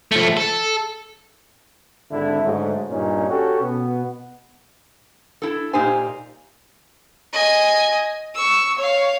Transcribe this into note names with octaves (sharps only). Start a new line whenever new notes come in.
F3 A3
A4
G#1 D3 E4
G#2 D3 F#3 A3
G2 A#2 C#4 D#4
C#4 F#4 G4 A4
B2 B3
E4 A4
A#2 A#3 D#4 G4 C5 G#5
D#5 G#5
C#6 E6
C#5 F5